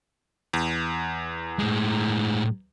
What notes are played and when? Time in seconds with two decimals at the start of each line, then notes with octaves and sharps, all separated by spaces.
0.53 E2
1.59 A2 G#3